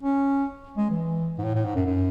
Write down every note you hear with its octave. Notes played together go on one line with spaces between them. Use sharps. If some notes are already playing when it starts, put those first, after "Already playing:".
C#4
G#3
E3
G#2
A2
A2
G#2
F#2
F#2